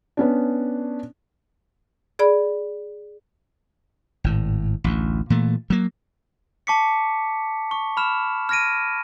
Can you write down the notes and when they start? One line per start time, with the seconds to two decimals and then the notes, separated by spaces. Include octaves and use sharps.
0.17 B3 C#4 D4
2.19 G#4 D5 B5
4.24 G#1 A2
4.84 A1 D2
5.30 A#2 E3 A3
5.70 F#3 A#3
6.67 A5 C#6 D6 B6 C#7
7.71 C#6
7.97 B5 F6 E7
8.49 F6 G#6 A#6 D7 D#7